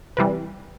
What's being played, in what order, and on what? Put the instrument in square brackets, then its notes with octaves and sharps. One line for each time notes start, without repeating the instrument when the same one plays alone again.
[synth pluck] C3 E3 G3 B4